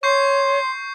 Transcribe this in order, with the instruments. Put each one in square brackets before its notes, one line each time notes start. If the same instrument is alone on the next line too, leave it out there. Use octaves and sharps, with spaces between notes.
[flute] C#5 [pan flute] C6 [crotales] C#6 G6 C7